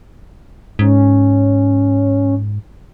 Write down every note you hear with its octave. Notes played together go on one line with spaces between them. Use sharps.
G#2 C#4